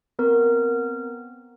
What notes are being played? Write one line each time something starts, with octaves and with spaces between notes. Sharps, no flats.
B3 C4 A#4